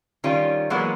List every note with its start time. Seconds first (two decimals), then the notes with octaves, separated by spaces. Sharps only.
0.24 D#3 G3 C#4 F4
0.70 E3 F#3 G#3 A#3 B3 F#4